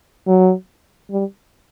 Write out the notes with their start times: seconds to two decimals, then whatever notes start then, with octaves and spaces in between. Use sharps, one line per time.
0.27 F#3
1.10 G3